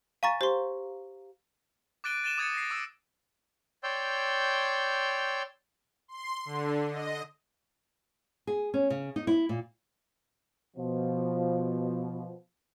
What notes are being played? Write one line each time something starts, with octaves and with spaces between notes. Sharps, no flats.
F5 G#5 A#5 C#6 A6
G4 C5 C6
D6 F#6 A6 D7 D#7 G7
A6 D#7 E7 G7
D6 D#6 G#6 A6 C#7
A#6 C7
D6 E6
C#5 D5 G5 C6 E6 G6
C6
D3
D#5
G#4
C#4
C#3
D#4
E4
A#2
B2 F3